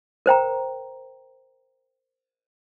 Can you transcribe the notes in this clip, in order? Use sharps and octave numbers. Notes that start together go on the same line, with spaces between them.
A#4 C5 G5 A#5